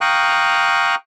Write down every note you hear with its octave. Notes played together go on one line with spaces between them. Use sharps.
F5 G5 A#5 C#6 D#6 F#6